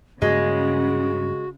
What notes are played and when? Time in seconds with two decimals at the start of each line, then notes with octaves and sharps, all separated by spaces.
0.22 G2 C#3 G#3 A#3 F#4